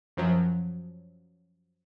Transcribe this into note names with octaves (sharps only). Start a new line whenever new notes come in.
F#2 F3 F#3